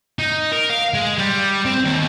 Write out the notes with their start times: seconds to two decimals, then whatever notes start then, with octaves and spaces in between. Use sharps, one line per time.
0.19 D#4
0.52 A#4
0.70 F5
0.94 G#3
1.18 G3
1.65 C4
1.84 D#2